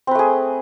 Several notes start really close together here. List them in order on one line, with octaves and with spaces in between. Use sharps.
C4 B4 A3 G#4